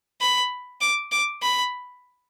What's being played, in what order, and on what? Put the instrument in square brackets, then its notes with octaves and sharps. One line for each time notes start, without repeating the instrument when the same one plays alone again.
[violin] B5
D6
D6
B5